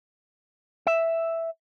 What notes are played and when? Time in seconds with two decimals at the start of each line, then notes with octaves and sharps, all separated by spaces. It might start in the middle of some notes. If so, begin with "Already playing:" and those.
0.87 E5